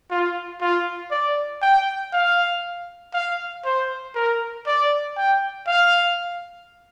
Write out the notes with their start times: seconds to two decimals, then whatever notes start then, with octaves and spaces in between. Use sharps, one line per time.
0.10 F4
0.61 F4
1.11 D5
1.62 G5
2.13 F5
3.14 F5
3.65 C5
4.15 A#4
4.66 D5
5.17 G5
5.67 F5